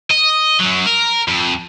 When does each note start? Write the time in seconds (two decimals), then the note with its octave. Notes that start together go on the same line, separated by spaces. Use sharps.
0.11 D#5
0.61 F#2 F#3
0.86 A#4
1.28 F2